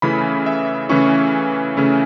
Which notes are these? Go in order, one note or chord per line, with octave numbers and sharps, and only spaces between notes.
C#3 E3 A3 C#4 E4 B5
E5
C#3 E3 A3 C#4 E4 C#6
C#3 E3 A3 C#4 E4